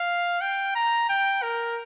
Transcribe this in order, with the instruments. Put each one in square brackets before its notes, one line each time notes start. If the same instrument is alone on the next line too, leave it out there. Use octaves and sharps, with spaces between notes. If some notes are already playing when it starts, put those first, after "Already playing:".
Already playing: [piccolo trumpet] F5
G5
A#5
G5
A#4